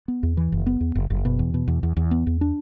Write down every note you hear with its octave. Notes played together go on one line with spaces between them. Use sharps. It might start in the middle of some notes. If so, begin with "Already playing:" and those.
B3
E2
E3
F#1
B3
E2
F#1
F#1
B2
E2
B2
E2
E2
E2
B3
E2
D4